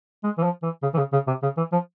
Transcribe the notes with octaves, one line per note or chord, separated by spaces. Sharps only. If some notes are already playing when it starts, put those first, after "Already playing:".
G#3
E3
F3
E3
C#3
E3
C#3
C#3
C3
C#3
E3
F3